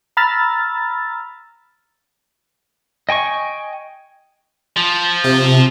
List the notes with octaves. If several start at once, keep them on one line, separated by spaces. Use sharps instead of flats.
A#5 B5 E6 F6 A6
D#5 G5 G#5 C#6
F3
C3